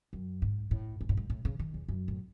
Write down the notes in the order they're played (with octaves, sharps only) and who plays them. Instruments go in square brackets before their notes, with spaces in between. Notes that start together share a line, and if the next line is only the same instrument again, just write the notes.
[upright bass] F#2
G#2
A2
G#2
A2
G#2
A2
C#3
D#3
E2
F#2
A2